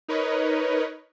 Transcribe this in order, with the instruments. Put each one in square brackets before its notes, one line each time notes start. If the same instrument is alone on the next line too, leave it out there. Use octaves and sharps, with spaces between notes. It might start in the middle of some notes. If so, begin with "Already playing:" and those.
[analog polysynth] D#4 A#4 B4 C#5 D#5